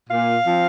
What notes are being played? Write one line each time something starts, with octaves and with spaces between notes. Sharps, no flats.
A#2 F5
F3 C4